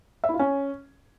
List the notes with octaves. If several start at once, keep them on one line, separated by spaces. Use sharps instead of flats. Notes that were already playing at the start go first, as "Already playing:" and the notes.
E5
E4
F4
C#4